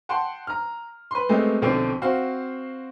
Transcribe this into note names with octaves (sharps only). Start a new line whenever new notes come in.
F#5 G5 A5 C6
A#5 F6
B4 C6
G#3 A3 B3 C4 G4
B1 D3 F3 C4 G5 C7
C4 F#4 C5 F5